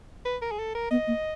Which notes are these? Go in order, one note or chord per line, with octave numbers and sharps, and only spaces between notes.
B4
A#4
G#4
A4
A#4
B3 D#5
A#3